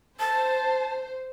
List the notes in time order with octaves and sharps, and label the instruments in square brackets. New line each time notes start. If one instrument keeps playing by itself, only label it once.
[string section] C5 [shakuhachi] A5